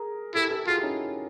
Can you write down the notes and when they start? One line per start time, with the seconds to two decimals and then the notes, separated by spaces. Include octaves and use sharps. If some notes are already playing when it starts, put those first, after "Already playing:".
Already playing: G#4 A#4
0.35 E4 G4 A4
0.51 G4 A4
0.67 F4 F#4 G#4
0.78 E4
0.83 C#4 D#4